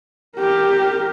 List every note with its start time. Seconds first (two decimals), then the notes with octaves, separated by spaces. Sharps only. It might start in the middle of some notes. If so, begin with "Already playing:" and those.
0.38 G4 A#4